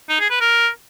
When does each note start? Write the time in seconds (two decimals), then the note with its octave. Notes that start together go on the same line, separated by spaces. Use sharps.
0.09 D#4
0.20 G#4
0.30 B4
0.41 A#4